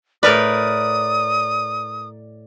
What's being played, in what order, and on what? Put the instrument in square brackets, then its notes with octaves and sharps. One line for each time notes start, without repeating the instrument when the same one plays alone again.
[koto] A2 A#4 B4 [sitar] D5 [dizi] D#6